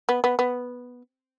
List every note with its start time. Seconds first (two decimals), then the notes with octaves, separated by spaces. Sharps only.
0.09 B3
0.24 B3
0.39 B3